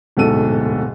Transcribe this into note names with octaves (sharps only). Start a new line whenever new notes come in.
D1 G#2 B2 A4 D#7